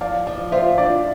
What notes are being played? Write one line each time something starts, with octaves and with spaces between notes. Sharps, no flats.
F3 D5 F5
F3 D5
F4 C5 E5
D4 D5